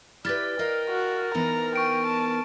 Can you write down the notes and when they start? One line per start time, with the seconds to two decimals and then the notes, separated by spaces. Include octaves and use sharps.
0.25 E4 G4 B4 D5 F6 A6
0.59 A#4 D#5 F5 G5
0.89 F#4
1.34 E3 B3 D#4 A#5
1.76 G5 C#6 D7
2.06 A5